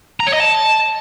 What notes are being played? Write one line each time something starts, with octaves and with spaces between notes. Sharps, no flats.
A#5
C#5
D#5
A5